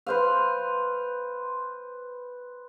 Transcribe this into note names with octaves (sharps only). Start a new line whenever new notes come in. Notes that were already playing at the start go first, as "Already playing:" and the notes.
B4 C5 F5